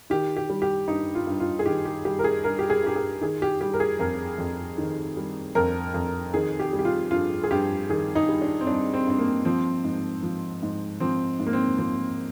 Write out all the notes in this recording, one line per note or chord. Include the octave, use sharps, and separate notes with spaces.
D#3 G4
G4
G3
G4
G2 D#4
F4
G2
F4
G#4
D#3 G4
G4
G3 G4
A#4
G#4
G2 A#4
G4
G#4
G2 G4
G#4
D#3 G#4
G4
G3 G4
A#4
G#4
F2 A#4
F2
D#3
G3
F2 A#4
F2
D#3 G#4
G4
G3
G4
F4
G2 F4
G#4
G2 G4
D#3 G#4
D#4
G3
D4
C4
G2 D4
C4
G2 C4
A#3
F3 C4
G#2
F3
G#2
F3 C4
G#2
A#3
C4
F3 C4